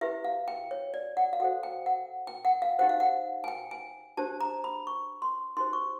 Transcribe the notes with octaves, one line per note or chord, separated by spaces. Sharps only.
E4 G4 B4 E5
F5
G5
C#5
D5
F#5
F5
F#4 A4 C5 F#5
G5
F#5
G5
F#5
F5
D#4 G4 C5 F#5
F5
F#5
G#5
G5
G#5
D4 G4 C5 A5
A#5
B5
C#6
C6
D#4 G4 C5 C6
C#6